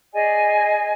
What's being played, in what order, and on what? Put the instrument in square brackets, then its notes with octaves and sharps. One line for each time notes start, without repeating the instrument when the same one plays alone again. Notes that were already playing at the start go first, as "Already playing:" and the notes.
[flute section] G#4 D5 D#5 G#5